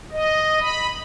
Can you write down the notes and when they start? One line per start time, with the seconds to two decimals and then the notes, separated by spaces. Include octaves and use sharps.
0.12 D#5
0.60 B5